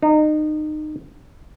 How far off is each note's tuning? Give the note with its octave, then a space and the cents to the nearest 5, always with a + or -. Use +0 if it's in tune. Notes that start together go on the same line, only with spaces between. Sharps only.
D#4 -25